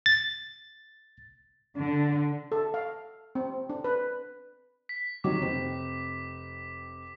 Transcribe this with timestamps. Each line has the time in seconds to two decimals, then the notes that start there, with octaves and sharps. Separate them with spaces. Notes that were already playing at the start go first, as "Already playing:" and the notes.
0.06 A6
1.75 D3
2.52 A4
2.74 F5
3.35 C4
3.70 D4
3.84 B4
4.89 B6
5.24 C3 D#3 F#3 D6
5.40 F1 C4